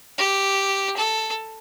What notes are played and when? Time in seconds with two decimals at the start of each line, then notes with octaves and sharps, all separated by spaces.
0.18 G4
0.97 A4